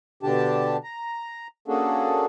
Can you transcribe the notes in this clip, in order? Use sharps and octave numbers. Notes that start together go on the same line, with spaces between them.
B2 D3 D4 G4 A5
A#5
A#3 C#4 D4 F#4 G#4 A4